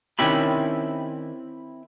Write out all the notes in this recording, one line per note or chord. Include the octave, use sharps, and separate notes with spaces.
D#3 C4 C#4 E4 G4 B5